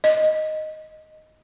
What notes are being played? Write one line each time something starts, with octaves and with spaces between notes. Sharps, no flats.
D#5